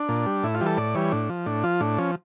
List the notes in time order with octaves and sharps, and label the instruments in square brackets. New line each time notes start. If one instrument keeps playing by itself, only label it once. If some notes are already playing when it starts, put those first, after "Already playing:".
Already playing: [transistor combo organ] D4
A#2
G3
A2 E4
F4
E3 G3
A4
A2 D5
E3 G3 C#5
A2 D4
F3
A2 D4
F3 F4
A2 D4
F3 C#4